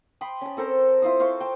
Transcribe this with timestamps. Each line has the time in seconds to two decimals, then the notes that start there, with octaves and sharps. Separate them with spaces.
0.21 G5 B5 C6 D#6
0.41 C#4 A5
0.57 C4 A4 A#4 C5
1.02 E4 F4 C5 D#6
1.20 C5 F5 C6 C#6
1.40 G5 A5